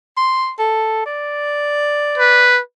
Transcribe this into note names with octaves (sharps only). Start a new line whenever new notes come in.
C6
A4
D5
B4